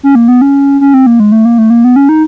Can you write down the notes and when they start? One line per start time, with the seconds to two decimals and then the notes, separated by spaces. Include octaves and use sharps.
0.03 C#4
0.15 A#3
0.28 B3
0.41 C#4
0.81 C#4
0.94 C4
1.06 A#3
1.20 G#3
1.32 A3
1.45 A#3
1.58 A3
1.70 A#3
1.84 B3
1.96 C#4
2.09 D#4